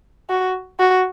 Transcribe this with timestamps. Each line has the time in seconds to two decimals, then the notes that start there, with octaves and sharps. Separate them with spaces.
0.30 F#4
0.79 F#4